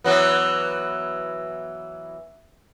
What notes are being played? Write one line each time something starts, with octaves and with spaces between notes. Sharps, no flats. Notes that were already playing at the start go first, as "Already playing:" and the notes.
E3 F#3 B3